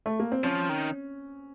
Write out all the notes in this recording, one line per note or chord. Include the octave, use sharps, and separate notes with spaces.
A3
A#3
C4
F3 C#4
D#3